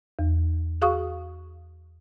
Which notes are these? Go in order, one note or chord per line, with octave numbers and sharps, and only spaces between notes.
E2
F#4 G#4 F5 C#6 D#6